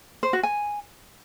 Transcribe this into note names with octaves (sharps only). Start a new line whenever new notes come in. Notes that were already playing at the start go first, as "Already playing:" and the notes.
C5
F#4
G#5